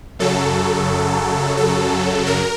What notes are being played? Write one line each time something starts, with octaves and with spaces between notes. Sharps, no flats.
F#2 C#3 F#3 A4
A4
A#4